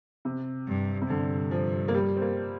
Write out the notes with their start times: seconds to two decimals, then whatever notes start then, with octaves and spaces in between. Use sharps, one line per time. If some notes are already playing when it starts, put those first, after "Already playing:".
0.25 C3
0.68 G2
1.01 C3
1.09 G2 D3
1.51 F3
1.88 A#3
1.94 G3
2.16 C4
2.22 A#3